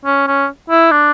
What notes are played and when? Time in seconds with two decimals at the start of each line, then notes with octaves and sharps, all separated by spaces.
0.05 C#4
0.27 C#4
0.70 E4
0.91 D4